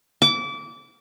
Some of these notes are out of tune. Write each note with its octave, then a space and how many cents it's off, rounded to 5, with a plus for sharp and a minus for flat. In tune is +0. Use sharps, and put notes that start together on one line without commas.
D6 -25